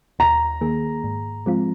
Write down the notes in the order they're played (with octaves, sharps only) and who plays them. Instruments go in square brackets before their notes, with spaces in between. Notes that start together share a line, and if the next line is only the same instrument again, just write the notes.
[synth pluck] D#2 [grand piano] A#5
[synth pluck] D#3 A#3 G#4
G#2
F3 G#3 C4 F4